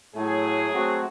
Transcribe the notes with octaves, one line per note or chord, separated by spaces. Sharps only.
A2 F#3 A3 G#4
A3 C4 F#4